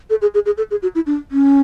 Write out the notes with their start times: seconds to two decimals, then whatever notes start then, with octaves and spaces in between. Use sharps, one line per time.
0.10 A4
0.22 G#4
0.34 G#4
0.46 G#4
0.57 A4
0.71 G#4
0.82 F#4
0.95 E4
1.07 D4
1.31 C#4